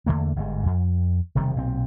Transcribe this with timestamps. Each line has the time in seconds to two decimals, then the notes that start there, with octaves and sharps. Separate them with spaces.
0.06 E2 D3 A3 A#3
0.36 G1 G#2 D3 G#3
0.66 F2
1.35 E1 C3 D#3 G3
1.56 B1 A#2 C4